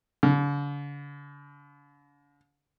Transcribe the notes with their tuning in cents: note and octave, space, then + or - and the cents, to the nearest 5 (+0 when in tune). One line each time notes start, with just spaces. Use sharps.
D3 -45